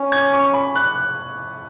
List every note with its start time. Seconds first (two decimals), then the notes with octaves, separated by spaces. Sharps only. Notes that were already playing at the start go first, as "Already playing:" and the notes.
Already playing: C#4
0.12 G#6
0.33 C#6
0.53 B5
0.75 F#6